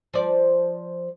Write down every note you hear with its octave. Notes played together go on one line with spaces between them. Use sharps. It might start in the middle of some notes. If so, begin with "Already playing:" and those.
F3 D5